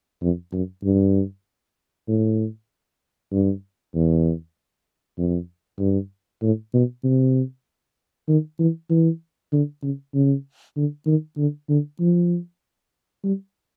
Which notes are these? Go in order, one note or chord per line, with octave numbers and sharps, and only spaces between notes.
F2
F#2
G2
A2
G2
E2
F2
G2
A2
B2
C3
D#3
E3
E3
D3
C#3
C#3
D3
D#3
D3
D3
F3
G3